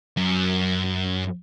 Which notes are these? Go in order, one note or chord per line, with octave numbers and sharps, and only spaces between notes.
F#2